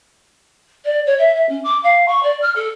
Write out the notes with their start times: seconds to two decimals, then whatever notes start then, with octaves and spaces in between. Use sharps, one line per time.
0.85 D5
1.06 C#5
1.18 E5
1.35 E5
1.49 C#4
1.64 D6
1.83 F5
2.08 C#6
2.23 D5
2.42 F6
2.56 A4